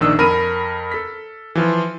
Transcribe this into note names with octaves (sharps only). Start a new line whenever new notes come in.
A#1 D#3 D4 D#6 E6
F2 A#4 B5 F6 D#7
A4 B6
E3 F3 F4